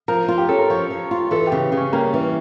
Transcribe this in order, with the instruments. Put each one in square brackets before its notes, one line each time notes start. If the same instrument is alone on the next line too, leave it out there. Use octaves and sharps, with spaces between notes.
[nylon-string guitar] F3 [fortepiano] A#4
[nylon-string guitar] F4
[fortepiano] G4
[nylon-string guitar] C#4 [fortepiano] A4
[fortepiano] A#4
[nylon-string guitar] F3 [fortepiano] C#5
[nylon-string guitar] F3
F4
[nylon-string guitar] E3 [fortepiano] A4
[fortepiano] G4
[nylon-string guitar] C#3
C#3
[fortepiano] C#4
[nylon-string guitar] G3 [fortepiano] A#3
[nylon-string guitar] E3